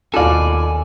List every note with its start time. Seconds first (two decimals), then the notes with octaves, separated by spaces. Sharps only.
0.14 D#2 B2 F4 A4 D5 G#5